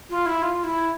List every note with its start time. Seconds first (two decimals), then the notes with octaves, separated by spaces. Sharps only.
0.10 F4
0.26 E4
0.42 F4
0.63 E4